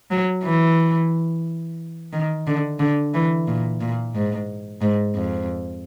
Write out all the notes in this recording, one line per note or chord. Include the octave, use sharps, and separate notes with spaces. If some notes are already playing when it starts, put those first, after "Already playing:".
F#3
E3
D#3
D3
D3
E3
A#2
A#2
G#2
G#2
F2